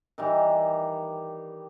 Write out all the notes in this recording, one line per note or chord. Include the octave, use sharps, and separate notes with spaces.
D#3 E3 G3